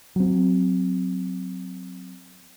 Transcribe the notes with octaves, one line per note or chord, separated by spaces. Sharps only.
F#3 C4